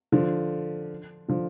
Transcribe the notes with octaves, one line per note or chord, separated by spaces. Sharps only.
D3 F3
D3 F3